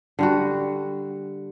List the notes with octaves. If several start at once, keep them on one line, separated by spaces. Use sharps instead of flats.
D3 G3 F#4